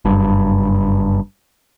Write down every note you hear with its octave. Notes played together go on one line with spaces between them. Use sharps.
F#1 G2